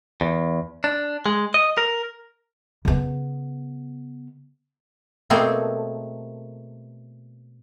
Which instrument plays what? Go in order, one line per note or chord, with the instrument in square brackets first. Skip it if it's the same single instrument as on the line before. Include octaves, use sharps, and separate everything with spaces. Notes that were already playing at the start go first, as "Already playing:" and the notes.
[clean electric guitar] E2
D4
G#3
D#5
A#4
[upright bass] C#3 B3
[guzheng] B2 A3 A#3 C4 G#4 A4